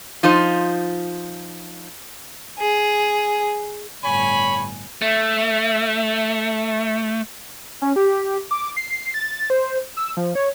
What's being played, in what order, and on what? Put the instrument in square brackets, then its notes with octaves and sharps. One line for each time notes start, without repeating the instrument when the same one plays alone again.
[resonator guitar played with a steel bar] F3 D#4 F4 C5
[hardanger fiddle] G#4
[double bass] G1 A2 [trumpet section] C#5 B5 [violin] G#5
[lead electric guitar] A3 [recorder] E5
[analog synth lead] C#4
G4
D6
C7
A6
C5
E6
F3
C#5